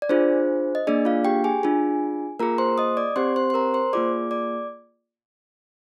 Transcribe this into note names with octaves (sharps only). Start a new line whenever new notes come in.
D5
D4 F4 G#4 C5
D#5
A#3 D4 G#4 D5
F4 F5
G4 G5
G#4 G#5
D4 F4 G#4
A#3 F4 G#4 A#4 A#5
C5 C6
D#5 D#6
D5 D6
C4 G4 C5 C6
C5 C6
C6
A#4 A#5
C5 C6
A#3 F4 G#4 D5 D6
D5 D6